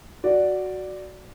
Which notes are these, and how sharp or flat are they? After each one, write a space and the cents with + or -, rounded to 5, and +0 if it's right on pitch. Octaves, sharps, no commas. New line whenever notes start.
F#4 +0 D5 +0